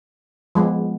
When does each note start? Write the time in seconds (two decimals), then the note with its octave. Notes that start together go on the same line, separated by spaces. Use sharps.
0.55 F3 G#3 B3